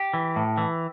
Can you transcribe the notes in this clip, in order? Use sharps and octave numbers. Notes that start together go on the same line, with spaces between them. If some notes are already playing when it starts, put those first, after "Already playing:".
Already playing: G4
E3
A2
E3